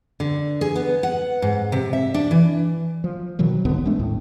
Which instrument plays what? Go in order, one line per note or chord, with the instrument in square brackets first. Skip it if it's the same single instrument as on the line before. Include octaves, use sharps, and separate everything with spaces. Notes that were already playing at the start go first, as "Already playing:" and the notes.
[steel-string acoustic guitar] D3
G#4
B3
F#5
G#2
C3
E5
D4
E3
[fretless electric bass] F3
B2 D#3 E3 F#3
C2 G#2 D3 B3
A1 G#3 A3 D4
D#2 A2